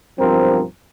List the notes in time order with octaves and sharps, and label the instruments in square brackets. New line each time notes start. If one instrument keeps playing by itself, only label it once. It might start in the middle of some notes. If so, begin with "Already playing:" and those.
[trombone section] B1 G2 F3 C4 A#4